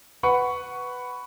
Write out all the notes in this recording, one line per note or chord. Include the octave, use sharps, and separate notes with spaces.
B4 F#5 B5 C#6